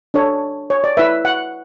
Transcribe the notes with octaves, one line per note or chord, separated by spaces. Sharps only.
D4 A4 C#5
C#5
D5
E4 B4 E5
F#5